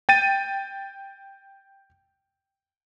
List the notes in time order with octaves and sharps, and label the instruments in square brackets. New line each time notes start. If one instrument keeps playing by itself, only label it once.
[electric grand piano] G5 A6 D#7